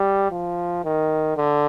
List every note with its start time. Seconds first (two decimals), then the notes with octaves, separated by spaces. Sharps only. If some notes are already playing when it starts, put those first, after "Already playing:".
Already playing: G3
0.31 F3
0.84 D#3
1.37 D3